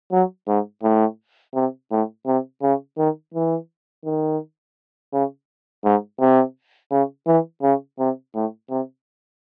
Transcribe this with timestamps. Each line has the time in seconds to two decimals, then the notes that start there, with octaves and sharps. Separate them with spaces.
0.12 F#3
0.48 G#2
0.83 A2
1.54 C3
1.91 A2
2.26 C3
2.62 C#3
2.98 D#3
3.34 E3
4.05 D#3
5.13 C#3
5.84 G#2
6.20 C3
6.91 C#3
7.27 E3
7.62 C#3
7.99 C3
8.34 A2
8.70 C3